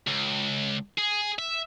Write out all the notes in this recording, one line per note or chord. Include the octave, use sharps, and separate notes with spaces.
C#2
G#4
E5